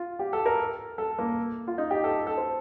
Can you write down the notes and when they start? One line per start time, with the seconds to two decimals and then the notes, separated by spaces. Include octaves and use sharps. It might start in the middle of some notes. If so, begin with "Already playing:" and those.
Already playing: F4
0.19 G4
0.33 A4
0.46 A#4
0.98 A4
1.19 A#3
1.67 F4
1.78 D#4
1.91 G4
2.04 A4
2.27 A4
2.37 C5